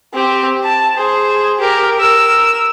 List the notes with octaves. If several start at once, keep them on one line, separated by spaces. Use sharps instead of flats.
C4 G4
A5
G#4 C5
G4 A#4
A#4 E6